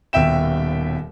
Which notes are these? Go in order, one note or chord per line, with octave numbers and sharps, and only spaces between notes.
D#1 D#2 B2 E5 G5 E7